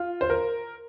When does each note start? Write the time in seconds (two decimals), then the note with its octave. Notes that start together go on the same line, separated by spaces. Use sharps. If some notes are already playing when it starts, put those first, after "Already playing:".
Already playing: F4
0.21 C5
0.30 A#4